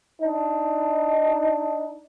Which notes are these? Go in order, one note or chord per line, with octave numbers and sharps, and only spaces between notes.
D4 D#4